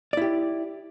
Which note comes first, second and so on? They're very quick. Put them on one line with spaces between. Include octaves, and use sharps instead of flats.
D5 E4 G4